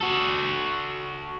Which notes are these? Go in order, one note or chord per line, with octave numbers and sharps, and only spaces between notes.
F#4 A4